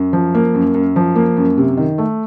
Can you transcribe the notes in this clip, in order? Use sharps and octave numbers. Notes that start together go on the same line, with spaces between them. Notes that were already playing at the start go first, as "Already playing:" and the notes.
Already playing: F#2
F3
A#3
F#2
F#2
F3
A#3
F#2
C3
D#3
A3